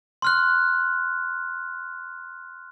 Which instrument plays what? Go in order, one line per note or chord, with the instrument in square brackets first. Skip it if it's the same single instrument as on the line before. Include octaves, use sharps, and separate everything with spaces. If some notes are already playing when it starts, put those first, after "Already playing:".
[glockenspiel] C6 F6 F#6